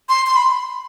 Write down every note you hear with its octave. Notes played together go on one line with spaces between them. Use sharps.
C6
C6
B5